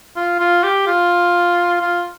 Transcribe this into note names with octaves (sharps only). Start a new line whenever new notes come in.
F4
F4
G4
F4
F4